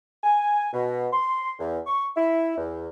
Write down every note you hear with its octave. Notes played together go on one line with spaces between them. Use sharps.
G#5
B2
C6
E2
C#6
E4
E2